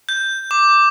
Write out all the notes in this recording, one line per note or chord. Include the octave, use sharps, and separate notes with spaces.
G6
D6